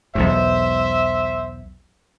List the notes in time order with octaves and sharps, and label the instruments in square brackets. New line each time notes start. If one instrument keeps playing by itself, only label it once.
[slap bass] B1 E2 G#2 [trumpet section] C5 E5